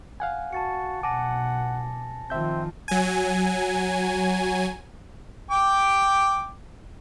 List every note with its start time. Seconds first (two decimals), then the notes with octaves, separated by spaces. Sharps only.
0.20 F5 F#5 G#5
0.53 F#4 A5 A6 C#7
1.03 B1 F#5 G#5 A5 D6 A#6
2.30 D#3 F3 C4 E5 G6
2.88 F#3 G#5
5.51 G5 D6